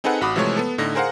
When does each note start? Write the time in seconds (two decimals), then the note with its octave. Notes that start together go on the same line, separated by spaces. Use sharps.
0.04 C4 D#4 G#4 A4 B4 F#5
0.21 A1 F#4 B5 D6 D#6
0.36 C3 E3 F3 G#3 A3 C#5
0.57 B3 A4
0.78 A2 D3 D#4 A#6
0.95 G#4 A#4 C5 F5 F#5